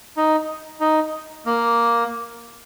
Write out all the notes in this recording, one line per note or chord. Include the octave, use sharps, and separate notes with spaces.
D#4
D#4
A#3